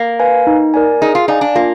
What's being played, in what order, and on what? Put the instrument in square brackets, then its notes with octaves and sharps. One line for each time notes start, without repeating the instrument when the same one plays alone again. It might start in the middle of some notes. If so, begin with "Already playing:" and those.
Already playing: [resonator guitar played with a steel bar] A#3
[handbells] B4 F5 G#5
D#4
A#4 D5 G#5
[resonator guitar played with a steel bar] D#4 [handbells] G#4
[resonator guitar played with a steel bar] F4
[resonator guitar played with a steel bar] D#4 [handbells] D5 F5 G#5
[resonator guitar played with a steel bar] D4
[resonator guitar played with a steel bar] A#3 [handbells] F4